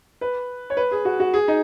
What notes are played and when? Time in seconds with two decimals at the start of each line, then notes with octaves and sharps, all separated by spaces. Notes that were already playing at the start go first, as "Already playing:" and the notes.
0.21 B4
0.70 C#5
0.77 B4
0.91 G#4
1.05 F#4
1.20 F#4
1.34 G#4
1.48 D#4